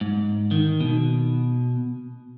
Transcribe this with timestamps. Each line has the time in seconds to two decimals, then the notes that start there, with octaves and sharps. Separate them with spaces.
0.01 G#2
0.51 D#3
0.81 B2